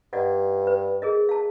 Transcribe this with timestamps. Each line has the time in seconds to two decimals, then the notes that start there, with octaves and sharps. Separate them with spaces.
0.13 G2 D5 D#5 F#5
0.67 B4
1.02 G#4 A#4 D#5
1.29 F5 A5